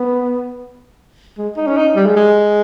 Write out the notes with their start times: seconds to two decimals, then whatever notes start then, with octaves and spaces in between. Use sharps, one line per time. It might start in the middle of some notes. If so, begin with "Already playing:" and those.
Already playing: B3
1.38 G#3
1.57 D#4
1.67 C#4
1.77 D#4
1.96 G3
2.06 G#3
2.16 G#3